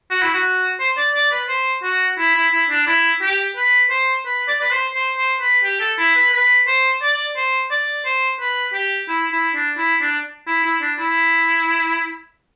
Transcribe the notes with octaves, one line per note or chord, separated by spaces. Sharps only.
F#4
E4
F#4
C5
D5
D5
B4
C5
F#4
E4
E4
E4
D4
E4
G4
B4
C5
B4
D5
B4
C5
C5
C5
B4
G4
A4
E4
B4
B4
C5
D5
C5
D5
C5
B4
G4
E4
E4
D4
E4
D4
E4
E4
D4
E4